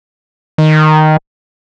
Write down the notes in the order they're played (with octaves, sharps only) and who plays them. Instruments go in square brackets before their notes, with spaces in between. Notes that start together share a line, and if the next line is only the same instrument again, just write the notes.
[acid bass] D#3